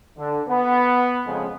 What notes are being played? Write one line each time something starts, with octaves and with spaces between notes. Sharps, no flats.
D3
B3
F2 C#3 G#3